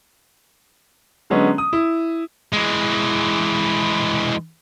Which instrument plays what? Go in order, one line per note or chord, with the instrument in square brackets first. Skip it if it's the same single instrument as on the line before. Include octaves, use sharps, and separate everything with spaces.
[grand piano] D3 F#3 G#3 B3 C#4
D#6
E4
[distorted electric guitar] E3 G#3